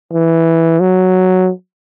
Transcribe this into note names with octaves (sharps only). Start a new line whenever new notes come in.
E3
F#3